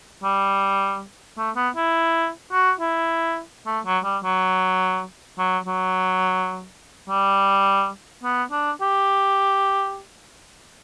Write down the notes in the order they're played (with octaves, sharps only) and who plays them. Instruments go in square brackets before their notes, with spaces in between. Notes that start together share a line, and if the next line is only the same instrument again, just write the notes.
[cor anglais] G3
A3
B3
E4
F#4
E4
A3
F#3
G3
F#3
F#3
F#3
G3
B3
D4
G4